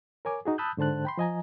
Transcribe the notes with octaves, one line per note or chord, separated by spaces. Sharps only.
A#4 C#5 G#5 D6
D#4 F#4 G#4
A5 B5 D#6 E6 F#6 G6
G#2 D3 C5 A5 F#6
G5 B5 C6
F3 D#5 G#5 A#5